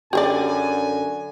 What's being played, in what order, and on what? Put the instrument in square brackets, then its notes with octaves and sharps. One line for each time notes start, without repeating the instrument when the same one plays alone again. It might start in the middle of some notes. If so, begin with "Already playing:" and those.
[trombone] F#2 [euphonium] D3 [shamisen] G4 G#4 D5 [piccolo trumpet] G#5